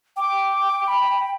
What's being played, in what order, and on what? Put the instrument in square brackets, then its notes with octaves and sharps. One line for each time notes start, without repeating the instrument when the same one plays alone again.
[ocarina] G5 [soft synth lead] D6
[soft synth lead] B5